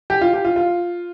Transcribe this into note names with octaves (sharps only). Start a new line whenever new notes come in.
G4
F4
G4
F4
F4